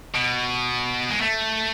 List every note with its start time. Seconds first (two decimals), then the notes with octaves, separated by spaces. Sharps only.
0.15 B2
1.10 G#3
1.20 A3